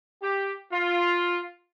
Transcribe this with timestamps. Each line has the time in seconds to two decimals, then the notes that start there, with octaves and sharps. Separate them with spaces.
0.22 G4
0.72 F4